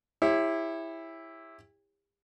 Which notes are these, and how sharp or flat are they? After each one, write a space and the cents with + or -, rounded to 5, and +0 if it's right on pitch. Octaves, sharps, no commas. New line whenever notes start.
E4 +0 G4 +40 C#5 -20